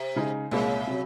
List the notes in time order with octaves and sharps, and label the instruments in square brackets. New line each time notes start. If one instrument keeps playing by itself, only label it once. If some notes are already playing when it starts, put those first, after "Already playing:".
Already playing: [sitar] C3
[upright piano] C#3 G#3 D#4 G#4
[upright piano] C2 A#2 G#3 [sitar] C#3
[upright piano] C3 F#3